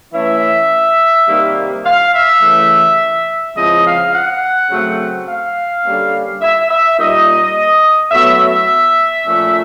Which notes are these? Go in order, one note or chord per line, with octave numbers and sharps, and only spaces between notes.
E3 A3 C#4 E4 E5
C3 D#3 G3 A#3
F5
E5
C#3 E3 A3
C#3 F3 G#3 C4 E4 D#5
F5
F#5
C#3 F#3 A3 C4
F5
D3 G3 A#3 C#4
E5
E5
A#2 G3 A#3 D#4 D#5
A2 F#3 B3 E5
E5
A#2 F3 A3 C#4